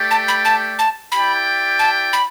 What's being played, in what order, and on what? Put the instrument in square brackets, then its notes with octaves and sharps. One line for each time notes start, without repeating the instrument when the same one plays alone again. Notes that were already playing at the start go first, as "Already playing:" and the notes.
Already playing: [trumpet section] A3 G4 D5 G5
[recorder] A5
B5
A5
A5
[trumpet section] E4 G4 D5 G5 [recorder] B5
[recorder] A5
B5